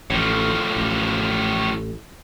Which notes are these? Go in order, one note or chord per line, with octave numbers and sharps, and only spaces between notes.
A1 A2 F3
A1